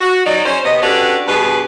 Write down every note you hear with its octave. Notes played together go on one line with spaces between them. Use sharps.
F#4
F#3 D#4 D5
C#4 C5
C3 B3 D#5
C#4 D4 F#4 G4 A4 B4
G2 B2 B3 G4 G#4 B4